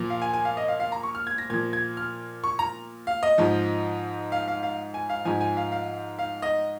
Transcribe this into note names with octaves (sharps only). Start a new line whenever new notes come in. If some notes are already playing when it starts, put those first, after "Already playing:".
Already playing: A#2 F3
F5
G#5
G#5
F5
D#5
F5
F5
A#5
C#6
F6
G#6
A#6
A#2 F3 G#6
G#6
F6
C#6
A#5
F5
D#5
G#2 F3
F5
F5
F5
G#5
F5
G#2 F3 G#5
G#5
F5
F5
F5
D#5